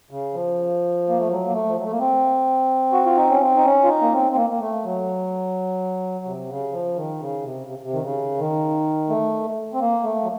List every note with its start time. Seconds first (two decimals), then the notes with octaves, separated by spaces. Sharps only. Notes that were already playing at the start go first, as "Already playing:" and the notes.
0.11 C#3
0.34 F3
1.09 A#3
1.19 A3
1.28 F#3
1.47 A#3
1.53 A3
1.69 F3
1.76 F#3
1.84 A3
1.91 A#3
2.00 C4
2.93 F#4
3.05 F4
3.17 D#4
3.30 C#4
3.41 C4
3.56 D#4
3.65 C#4
3.84 F4
3.88 D#4
4.02 A#3
4.13 C4
4.32 C4
4.37 A#3
4.50 A#3
4.60 A3
4.84 F#3
6.25 C3
6.49 C#3
6.73 F3
6.96 D#3
7.20 C#3
7.44 C3
7.67 C3
7.83 C3
7.93 D#3
8.03 C#3
8.39 D#3
9.09 A3
9.74 C4
9.80 A#3
10.03 A3
10.23 F#3